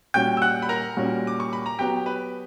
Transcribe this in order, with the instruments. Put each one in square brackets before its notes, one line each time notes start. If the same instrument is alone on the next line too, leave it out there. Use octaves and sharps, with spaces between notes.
[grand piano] A#2 G3 C#4 F#4 [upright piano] G5 G6
[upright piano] E6
F#5 F#6
B5
A#4 A#5
[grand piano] A#2 G3 C#4 F#4
[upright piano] D6
C#6
B5
A#5
[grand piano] F#3 B3 F#4 [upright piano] G4 G5
[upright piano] B4